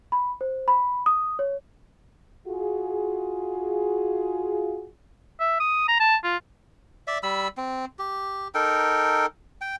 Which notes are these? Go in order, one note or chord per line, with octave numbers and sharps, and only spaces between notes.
B5
C5
B5
D#6
C#5
F4 F#4 G#4
E5
D#6
A#5
A5
F4
D5 E5
G3 B5 E6
C4
G4
D#4 A4 A#4 G5
G5